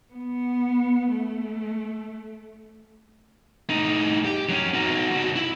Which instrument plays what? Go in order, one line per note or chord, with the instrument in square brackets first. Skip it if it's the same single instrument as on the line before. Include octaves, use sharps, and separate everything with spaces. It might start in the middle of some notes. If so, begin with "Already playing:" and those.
[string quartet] B3
A3
[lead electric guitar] A2 D#4
G4
F#3 C#4
D#4 F#4
C#3 F#4
E4